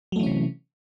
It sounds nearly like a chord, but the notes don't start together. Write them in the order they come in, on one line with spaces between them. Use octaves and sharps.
F#3 A3 E3 C#4 C3